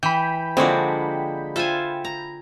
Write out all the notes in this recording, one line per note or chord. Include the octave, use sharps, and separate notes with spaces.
E3 G5 B5
D3 F3 G#3 A#3 C4 D4 F#4
F4 A4 C5 E5 G#5
A#5